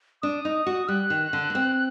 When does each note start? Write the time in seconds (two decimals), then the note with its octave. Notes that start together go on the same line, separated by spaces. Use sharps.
0.22 D4 D#6
0.45 D#4
0.66 F#4
0.88 G3 F#6
1.10 D#3
1.33 D3
1.50 A#3
1.55 C4